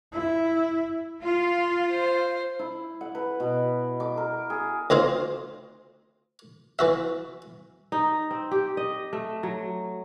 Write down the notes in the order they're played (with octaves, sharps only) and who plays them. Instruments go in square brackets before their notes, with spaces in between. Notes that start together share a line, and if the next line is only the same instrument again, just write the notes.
[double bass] E4
[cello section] F4
[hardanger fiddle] C5
[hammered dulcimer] E4
F#5
B4
B2
D6
A#4
G#4
[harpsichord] D2 C4 D#4 F4 C5
E3 F#4 E5
[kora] D#4
C4
G4
D#5
A3
F#3